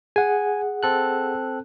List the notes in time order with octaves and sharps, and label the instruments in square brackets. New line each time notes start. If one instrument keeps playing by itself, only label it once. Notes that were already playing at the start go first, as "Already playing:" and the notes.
[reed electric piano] G#4 F#5 [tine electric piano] G#5
[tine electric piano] C4 A4 F#6